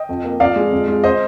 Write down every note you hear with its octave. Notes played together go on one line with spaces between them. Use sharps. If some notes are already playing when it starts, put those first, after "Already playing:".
Already playing: D#5 G5
F2
A#3
F2 D5 F5
G#3
F2
G#3
C5 D#5